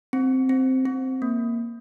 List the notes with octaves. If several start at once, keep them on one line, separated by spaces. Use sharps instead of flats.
C4
C4
C4
A#3